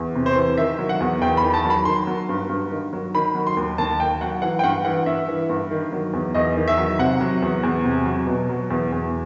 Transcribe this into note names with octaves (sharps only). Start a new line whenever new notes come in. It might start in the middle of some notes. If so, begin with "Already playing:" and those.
Already playing: E2
C3
C5
E3
D#3 E5
F#3
F#5
E2
E2 G5
B5
D#3
A5
F#3
B5
D#3 C6
F#3
G2
G2
D#3
F#3
D#3 B5
F#3
C6
D#2
D#2 A5
D#3 G5
F#3 F#5
E3 F#5
G5
G2 F#5
E3 F#5
G2 E5
E3
G2
D#3
F#3
E2
E2 D#5
D#3
E5
F#3
C3 F#5
F#3
E2
E2
C3
F#3
B2
F#3
E2
E2